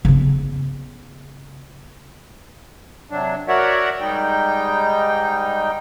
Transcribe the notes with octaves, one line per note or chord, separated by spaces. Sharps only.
C#3 B3
C3 F#3 D4
F#4 A#4 C#5 D5 E5 F#5
G#2 G3 D#4 G5